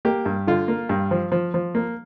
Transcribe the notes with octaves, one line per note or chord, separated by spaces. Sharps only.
A#3 G4
G2
D3 F4
A#3
G2
F3
F3
F3
A#3